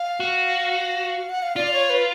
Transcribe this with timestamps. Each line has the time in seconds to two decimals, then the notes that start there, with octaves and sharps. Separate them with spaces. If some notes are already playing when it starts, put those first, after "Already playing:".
Already playing: F5
0.20 F#4
1.29 F#5
1.43 F5
1.56 F4 D5
1.67 D5
1.73 C#5
1.90 B4